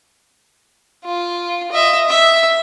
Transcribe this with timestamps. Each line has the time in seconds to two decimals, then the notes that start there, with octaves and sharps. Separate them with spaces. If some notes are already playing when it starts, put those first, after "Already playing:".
1.05 F4
1.72 D#5 E5
2.09 E5